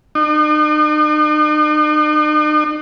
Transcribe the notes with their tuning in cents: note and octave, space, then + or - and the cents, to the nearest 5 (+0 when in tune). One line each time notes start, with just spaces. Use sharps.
D#4 -45